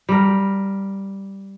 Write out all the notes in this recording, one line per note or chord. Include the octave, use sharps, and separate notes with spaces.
G3 A#4